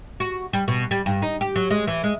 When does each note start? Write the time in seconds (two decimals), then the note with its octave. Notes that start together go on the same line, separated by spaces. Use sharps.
0.20 F#4
0.53 G3
0.68 B2
0.91 G3
1.06 G2
1.22 D#4
1.41 G4
1.56 F#3
1.70 G#3
1.87 E3
2.04 G#3